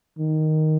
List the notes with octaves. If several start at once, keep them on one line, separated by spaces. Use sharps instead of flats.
D#3